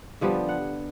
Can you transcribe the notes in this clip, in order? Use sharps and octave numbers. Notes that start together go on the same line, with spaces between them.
D3 F3 G3 B3
F#5